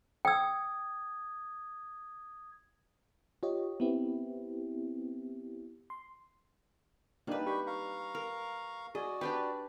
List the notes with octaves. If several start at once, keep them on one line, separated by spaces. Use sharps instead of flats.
G5 D#6 E6 G#6
F4 G4 C#5 D#5
B3 C4 E4 G4
C6
G3 A#3 D4 D#4 B4
G4 B5 C#6
F5 A#5 C#6
A#4
F#4 G#4 D5 D#5
D4 G4 B4 G5